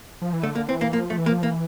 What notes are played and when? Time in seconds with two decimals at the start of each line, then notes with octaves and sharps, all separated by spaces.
0.22 F3
0.33 E3
0.43 D3 A3
0.55 A#3
0.68 E3 C4
0.81 A#3
0.93 F3 A#3
1.10 F3 A3
1.18 E3
1.26 A#3
1.32 F3
1.42 E3 A#3